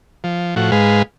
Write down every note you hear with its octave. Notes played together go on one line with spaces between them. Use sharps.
F3
A2 F3 F#4
G#2 G#3 B4 F5